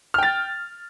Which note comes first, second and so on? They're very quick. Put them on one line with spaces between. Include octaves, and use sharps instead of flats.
F6 G5 A6